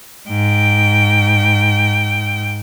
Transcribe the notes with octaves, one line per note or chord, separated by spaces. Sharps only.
G#2 G5